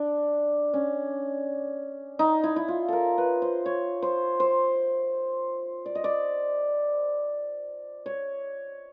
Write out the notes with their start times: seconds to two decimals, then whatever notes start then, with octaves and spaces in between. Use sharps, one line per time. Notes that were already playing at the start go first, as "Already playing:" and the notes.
Already playing: D4
0.74 C#4
2.19 D#4
2.43 E4
2.56 E4
2.68 F4
2.88 A4 A#4
3.18 B4
3.42 C5
3.66 C#5
4.02 C5
4.40 C5
5.86 D5
5.95 D#5
6.04 D5
8.06 C#5